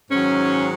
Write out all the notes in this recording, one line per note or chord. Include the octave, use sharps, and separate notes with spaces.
G#2 D#3 F#3 C#4